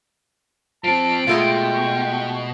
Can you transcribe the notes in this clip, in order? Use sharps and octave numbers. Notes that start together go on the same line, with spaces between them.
F3 C4 A5 D7
B2 G#3 A3 F4 G5
C#6